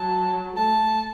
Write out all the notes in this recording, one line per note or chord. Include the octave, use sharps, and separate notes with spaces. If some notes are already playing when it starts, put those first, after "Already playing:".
Already playing: F#3 A5
A3 A5